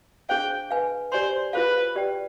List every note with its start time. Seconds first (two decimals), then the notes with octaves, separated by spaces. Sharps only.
0.29 D4 G#4 C5 F5 G5
0.71 B4 F5 G#5
1.12 G4 C5 D5 G#5 C6
1.53 F4 G#4 B4 C5 F5
1.96 G4 B4 D5 G5